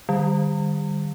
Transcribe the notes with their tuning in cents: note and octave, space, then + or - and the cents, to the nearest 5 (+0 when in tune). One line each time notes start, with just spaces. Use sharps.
D#3 -45 G3 +0